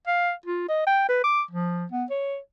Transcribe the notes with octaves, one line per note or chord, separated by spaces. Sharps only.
F5
F4
D#5
G5
B4
D6
F3
B3
C#5